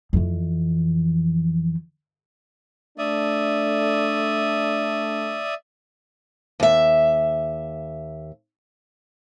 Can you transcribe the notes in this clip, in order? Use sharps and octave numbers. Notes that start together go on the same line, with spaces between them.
F2 E3
A3 D4 D5 E5 D#6
D#2 E5